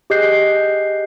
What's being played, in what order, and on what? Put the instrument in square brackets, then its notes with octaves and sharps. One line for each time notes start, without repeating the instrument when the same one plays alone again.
[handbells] G4 G#4 D#5 F#6 G6 C7